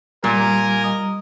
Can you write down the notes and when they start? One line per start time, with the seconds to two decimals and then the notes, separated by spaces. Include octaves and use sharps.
0.24 A#2 G3 A#4 G#5
0.84 D#5